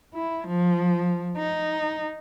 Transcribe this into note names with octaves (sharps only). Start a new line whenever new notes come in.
E4
F3
D#4